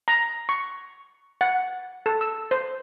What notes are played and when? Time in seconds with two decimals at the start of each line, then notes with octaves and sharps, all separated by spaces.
0.08 A#5
0.49 C#6
1.41 F#5
2.06 A4
2.21 E6
2.51 C5